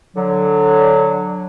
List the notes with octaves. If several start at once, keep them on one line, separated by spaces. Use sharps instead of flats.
D3 F#3